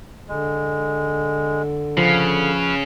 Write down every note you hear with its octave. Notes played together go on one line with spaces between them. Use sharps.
D3 G#3
C#3 F3 B4 F5